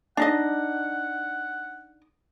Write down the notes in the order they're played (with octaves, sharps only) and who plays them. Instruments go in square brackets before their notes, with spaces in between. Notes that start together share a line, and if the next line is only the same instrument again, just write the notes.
[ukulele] D4 D#4 D#5 [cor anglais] F#5